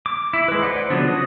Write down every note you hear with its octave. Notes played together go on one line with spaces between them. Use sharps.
D6
E4
G#3 B4
B4 C5 D5 F#5
C#3 F3 F#3 B3 D4
F#4 D#5